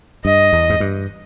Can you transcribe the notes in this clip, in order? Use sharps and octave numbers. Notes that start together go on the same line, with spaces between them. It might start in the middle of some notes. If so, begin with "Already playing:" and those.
G2 D#5
E2
G#2
G2